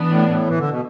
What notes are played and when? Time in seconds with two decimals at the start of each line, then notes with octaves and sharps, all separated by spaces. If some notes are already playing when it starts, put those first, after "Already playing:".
Already playing: E3 B3 D4
0.09 A2
0.29 A2
0.48 E3
0.59 D3
0.70 B2